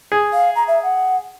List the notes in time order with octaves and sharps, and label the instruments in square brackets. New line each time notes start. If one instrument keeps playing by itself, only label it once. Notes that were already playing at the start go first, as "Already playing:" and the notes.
[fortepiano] G#4
[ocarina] F5
A#5
E5
F#5